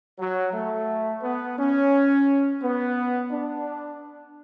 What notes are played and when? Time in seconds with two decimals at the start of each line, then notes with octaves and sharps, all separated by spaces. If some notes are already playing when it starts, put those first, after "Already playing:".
0.19 F#3
0.53 A3
1.23 B3
1.58 C#4
2.61 B3
3.31 D4